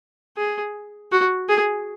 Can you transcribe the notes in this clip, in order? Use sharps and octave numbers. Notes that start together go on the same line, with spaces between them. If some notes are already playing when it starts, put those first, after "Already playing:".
G#4
F#4
G#4